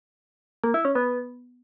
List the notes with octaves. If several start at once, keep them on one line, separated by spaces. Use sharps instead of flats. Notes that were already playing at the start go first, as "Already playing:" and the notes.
A#3
E4
C#4
B3